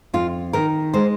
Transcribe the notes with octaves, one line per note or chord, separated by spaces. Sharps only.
F2 F4
D#3 A#4
G#3 C5